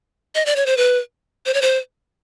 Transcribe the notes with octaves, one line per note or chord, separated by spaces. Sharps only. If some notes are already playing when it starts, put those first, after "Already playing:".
D#5
D5
C#5
C5
B4
C5
C#5
C5